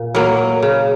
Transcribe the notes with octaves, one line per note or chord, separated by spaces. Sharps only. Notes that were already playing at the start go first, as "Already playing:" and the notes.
Already playing: A#2
F#3 A#3
C#3